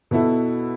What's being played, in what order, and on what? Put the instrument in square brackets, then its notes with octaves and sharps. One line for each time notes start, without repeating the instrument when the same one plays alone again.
[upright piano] B2 B3 E4 A4